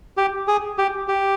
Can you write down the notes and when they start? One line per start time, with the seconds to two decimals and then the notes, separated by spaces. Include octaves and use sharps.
0.17 G4
0.48 G#4
0.78 G4
1.08 G4